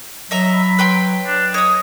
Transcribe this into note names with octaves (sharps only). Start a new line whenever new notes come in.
F#3 D#5 E5 A#5
B5
B4 G5 C6
D4
C#5 D#5 D#6